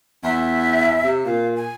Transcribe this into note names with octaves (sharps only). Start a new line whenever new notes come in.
E2 E5
C3
A#2 F5
G#5